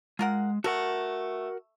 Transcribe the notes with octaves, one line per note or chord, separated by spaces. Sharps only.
G#3 F4 A#4 F#5
A3 F#4 A#4 F#5